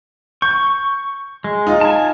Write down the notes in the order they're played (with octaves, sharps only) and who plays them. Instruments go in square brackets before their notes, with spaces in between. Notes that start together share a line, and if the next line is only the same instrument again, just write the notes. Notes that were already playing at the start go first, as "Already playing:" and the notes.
[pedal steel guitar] C#6 [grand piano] G6
[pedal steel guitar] G#3
[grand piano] D#4 F4
[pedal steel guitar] G#5 A5